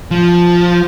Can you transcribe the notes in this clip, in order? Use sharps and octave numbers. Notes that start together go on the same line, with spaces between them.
F3